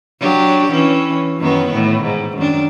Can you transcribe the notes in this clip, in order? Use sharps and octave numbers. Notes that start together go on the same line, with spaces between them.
F#3 D4 G4
E3 C#4
F#2 D#3 B3
A2
G#2
F#2 D#3 D4